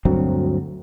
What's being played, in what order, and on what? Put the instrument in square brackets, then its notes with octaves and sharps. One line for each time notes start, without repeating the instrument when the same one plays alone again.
[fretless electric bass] D2 G2 F#3 C4